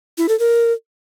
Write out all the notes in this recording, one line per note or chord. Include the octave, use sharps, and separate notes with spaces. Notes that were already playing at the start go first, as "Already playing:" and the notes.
E4
A4
A#4